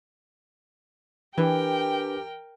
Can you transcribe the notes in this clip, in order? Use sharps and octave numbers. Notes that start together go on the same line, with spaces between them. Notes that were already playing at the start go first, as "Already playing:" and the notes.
E3 D4 G4 A#4 B4 G5 G#5